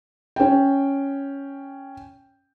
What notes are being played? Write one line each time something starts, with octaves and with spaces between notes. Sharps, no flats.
C#4 G5